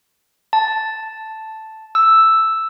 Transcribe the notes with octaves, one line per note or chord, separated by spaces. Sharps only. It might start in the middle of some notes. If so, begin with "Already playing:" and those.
A5
E6